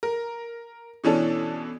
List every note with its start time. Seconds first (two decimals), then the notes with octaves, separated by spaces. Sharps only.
0.03 A#4
1.04 B2 E3 C#4 D4 A4